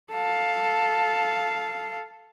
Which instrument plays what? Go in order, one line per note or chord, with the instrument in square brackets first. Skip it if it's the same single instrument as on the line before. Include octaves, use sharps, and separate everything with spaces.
[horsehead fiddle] A4 F5